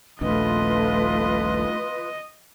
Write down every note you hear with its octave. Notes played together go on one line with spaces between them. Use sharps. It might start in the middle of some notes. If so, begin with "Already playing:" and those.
D#1 A#1 A3 D4 F4 B4 D#5